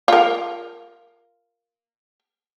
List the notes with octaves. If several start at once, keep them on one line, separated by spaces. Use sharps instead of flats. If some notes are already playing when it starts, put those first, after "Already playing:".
F4 A#4